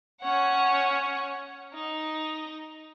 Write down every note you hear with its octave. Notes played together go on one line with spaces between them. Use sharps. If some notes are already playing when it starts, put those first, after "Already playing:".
C#4 C#5 F#5
D#4